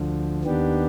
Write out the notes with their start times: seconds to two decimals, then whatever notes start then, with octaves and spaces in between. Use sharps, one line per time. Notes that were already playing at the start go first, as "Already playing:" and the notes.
Already playing: D2 D3 F3
0.45 D#2 D#3 B3 D4 G4